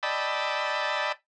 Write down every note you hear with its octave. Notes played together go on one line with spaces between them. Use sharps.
D5 D#5 G5 A5 B5 E6